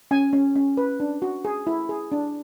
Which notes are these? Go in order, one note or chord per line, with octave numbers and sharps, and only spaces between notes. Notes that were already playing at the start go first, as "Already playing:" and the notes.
C#4 G#5
C#4
C#4
B4
D4
F#4
G#4
E4
G#4
D4